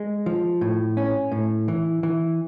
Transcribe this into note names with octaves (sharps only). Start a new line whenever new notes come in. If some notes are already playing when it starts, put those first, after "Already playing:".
Already playing: G#3
F3
A2
C#4
A2
E3
E3